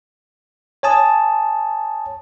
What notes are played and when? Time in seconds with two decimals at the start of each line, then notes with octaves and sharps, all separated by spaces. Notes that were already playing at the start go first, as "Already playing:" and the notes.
0.83 C#5 G#5 A5 D#6